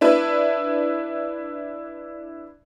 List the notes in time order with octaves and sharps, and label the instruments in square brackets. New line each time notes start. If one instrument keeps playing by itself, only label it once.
[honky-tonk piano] D4 E4 B4